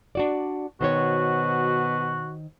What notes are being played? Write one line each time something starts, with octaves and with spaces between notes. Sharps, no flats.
D4 F#4 D5
B2 D#3 F#4 C5 C#5